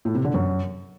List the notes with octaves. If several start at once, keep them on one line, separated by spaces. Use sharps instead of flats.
A2
C3
D3
F#2